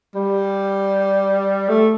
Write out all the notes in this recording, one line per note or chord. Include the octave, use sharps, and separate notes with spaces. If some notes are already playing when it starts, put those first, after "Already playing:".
G3
A3